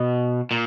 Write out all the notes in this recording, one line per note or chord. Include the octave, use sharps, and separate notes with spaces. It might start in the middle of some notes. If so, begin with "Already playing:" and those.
Already playing: B2
A#2